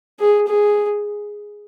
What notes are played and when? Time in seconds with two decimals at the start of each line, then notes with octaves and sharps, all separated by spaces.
0.20 G#4
0.47 G#4